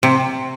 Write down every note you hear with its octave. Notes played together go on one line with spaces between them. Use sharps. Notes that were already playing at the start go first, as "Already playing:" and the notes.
C3